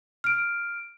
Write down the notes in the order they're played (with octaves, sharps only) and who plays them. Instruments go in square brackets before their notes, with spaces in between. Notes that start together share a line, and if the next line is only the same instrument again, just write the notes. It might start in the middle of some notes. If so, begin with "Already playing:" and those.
[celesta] F6 D7